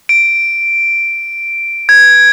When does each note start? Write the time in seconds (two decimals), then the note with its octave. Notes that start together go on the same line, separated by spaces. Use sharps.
0.09 D7
1.89 G#6